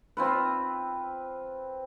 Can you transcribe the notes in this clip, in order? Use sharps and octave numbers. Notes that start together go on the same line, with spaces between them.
C4 F4 B4